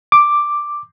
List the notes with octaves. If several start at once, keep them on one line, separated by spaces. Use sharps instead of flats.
D6